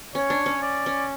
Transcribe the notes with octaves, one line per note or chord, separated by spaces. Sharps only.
C#4 C#5
D4
C#4
D5
C#4